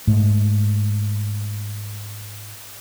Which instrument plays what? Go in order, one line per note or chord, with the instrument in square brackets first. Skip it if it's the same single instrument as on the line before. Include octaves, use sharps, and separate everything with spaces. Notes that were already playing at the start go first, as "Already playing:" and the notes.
[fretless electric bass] G#2 A3